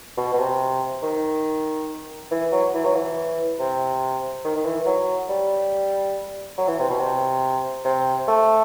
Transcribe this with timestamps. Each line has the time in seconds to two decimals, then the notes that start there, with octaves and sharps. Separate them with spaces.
0.17 B2
0.33 B2
0.38 C3
1.02 D#3
2.31 E3
2.52 F#3
2.74 E3
2.85 F#3
2.95 E3
3.59 C3
4.45 D#3
4.56 D#3
4.65 E3
4.86 F#3
5.29 G3
6.58 F#3
6.68 E3
6.79 C3
6.89 B2
6.99 C3
7.85 C3
8.28 A3